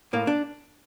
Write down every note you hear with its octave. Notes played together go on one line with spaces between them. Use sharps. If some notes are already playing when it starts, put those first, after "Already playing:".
A2 A#3
D4